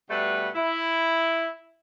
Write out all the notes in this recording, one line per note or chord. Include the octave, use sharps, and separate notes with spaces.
B2 G3 A3 B4
E4